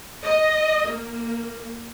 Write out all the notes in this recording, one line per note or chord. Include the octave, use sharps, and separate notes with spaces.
D#5
A#3